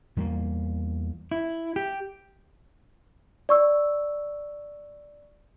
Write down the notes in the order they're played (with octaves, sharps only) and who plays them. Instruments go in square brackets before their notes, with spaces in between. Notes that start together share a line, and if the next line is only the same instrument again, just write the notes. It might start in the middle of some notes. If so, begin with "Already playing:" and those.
[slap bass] E2 G3 G#3 A#3
[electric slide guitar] E4
G4
[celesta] D5 C#6 E6